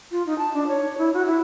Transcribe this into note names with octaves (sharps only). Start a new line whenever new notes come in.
F4
D#4
A5
D4
C#5
E4
F#4
E4